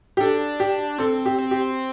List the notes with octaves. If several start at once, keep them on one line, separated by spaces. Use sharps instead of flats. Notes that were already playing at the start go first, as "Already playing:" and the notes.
G4
D4 A4
G4
C4 A4
G4
C4
G4